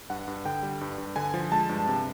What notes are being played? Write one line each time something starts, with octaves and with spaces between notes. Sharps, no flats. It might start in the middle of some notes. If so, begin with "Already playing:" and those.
G2 F#5
G2
D3 G5
G3
G2
G2
D3 G#5
F3
G#3 A5
G2
C3